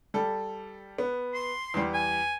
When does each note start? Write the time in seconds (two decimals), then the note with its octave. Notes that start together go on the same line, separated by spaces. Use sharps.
0.14 G3 A4
0.98 B3
1.34 C6
1.74 E2 G3
1.94 G#5